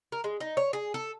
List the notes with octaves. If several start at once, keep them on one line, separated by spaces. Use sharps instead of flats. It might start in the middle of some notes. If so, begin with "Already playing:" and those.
A#4
G#3
D#4
C#5
G#4
A4